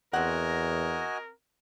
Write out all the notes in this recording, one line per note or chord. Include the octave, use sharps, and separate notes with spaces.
E2 C4 F#4 A#4 D#5 F#5 G#5